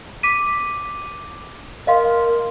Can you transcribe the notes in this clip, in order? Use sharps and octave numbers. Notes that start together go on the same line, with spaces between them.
D6 B6 D#7
A#4 D#5 F5 C6